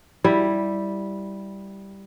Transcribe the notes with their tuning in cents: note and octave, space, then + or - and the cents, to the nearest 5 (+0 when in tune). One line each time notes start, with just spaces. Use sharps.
G3 +0 E4 +0